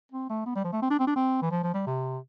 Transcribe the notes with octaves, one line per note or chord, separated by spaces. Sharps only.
C4
A3
B3
G3
F3
A3
C4
D4
C4
D4
C4
E3
F3
F3
G3
C3